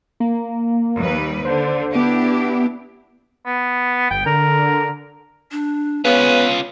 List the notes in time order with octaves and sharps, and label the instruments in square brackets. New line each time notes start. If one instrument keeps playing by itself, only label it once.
[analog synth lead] A#3
[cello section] D#2 G3 B4
[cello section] D3 [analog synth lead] C5
[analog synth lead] B3 [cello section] D4 E4 G4
[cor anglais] B3
[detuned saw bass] G1 [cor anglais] G5
[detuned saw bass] D3 [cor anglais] A#4
[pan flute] D4
[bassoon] C#3 [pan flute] B3 [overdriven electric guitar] C#4 F4 [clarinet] B4